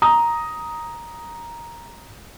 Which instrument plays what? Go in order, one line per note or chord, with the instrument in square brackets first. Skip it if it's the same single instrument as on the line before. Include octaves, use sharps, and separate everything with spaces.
[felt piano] A#5 D#6